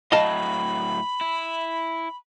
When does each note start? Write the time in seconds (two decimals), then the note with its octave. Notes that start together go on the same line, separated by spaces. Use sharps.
0.12 A2 F#3 D#5 F5 A5 B5
1.21 E4